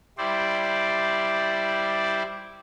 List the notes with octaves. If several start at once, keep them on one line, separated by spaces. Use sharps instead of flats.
G3 E4 C5 D5